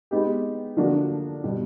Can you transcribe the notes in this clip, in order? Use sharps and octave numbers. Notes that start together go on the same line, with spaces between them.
G#3 B3 D#4 G4
D3 F3 A#3 D4 F#4
B2 G3